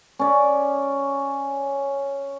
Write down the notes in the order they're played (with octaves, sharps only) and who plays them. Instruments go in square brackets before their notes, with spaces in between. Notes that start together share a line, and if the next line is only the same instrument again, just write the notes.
[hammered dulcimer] C#4 D5